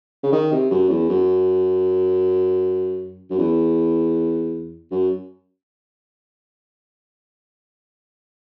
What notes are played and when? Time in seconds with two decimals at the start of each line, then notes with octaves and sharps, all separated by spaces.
0.23 C#3
0.32 D#3
0.52 C3
0.71 F#2
0.90 E2
1.09 F#2
3.30 F#2
3.39 E2
4.91 F#2